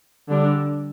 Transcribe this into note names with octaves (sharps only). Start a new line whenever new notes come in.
D3 G3 D4